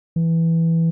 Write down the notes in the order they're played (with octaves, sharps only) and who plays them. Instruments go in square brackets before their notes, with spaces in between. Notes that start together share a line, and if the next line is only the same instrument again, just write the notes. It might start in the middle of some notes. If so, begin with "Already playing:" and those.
[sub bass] E3